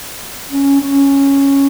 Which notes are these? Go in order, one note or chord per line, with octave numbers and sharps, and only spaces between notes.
C#4
C#4